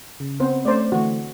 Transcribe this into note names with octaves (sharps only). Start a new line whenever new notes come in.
C#3
B3 C4 C5
A3 C#4 C5 D5
D3 E3 A3 F#4